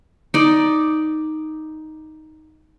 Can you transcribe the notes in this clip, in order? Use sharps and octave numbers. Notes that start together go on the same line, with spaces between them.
D#4 D5